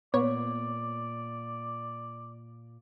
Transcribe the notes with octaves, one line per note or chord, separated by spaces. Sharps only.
A#2 B3 C#5 D5